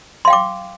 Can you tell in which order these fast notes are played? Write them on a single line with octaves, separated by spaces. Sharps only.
C6 F5 G5 D6